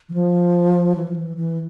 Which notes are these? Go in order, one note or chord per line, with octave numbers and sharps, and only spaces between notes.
E3
F3
E3
F3
E3
E3